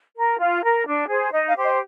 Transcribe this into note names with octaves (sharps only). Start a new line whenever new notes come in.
A#4
F4
A#4
D4
G#4 C5
D#4 D#5
F5
G4 C5
D#5